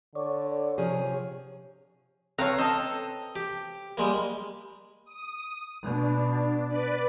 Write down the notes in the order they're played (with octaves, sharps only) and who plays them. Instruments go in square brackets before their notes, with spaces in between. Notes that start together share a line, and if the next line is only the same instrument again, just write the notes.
[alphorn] D3 [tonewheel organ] C#5 D5
[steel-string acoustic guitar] C3 F3 G#4 [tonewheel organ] C#5
[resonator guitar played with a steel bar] C4 A4 B4 [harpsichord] C#5 F5 A#5
[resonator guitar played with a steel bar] C4 A4 A5 [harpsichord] D#5
[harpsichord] G4
G3 G#3 A#3
[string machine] D#6
[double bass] B2 [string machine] D4
[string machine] B4 D5